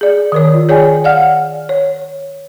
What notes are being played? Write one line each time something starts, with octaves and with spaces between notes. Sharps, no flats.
G#4 D5
D#3 A#4 C#5
F4
G#4 C#5 D5 G5 G#5
D5 F5 F#5 F6
C#5